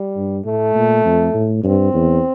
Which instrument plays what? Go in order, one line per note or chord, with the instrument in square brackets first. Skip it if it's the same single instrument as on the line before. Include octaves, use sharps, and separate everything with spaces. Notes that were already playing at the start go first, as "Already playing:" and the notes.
Already playing: [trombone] G3
[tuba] G2
[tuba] A2 [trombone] A3
[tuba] A#2
F2
A2
[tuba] G2 [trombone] C4
[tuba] E2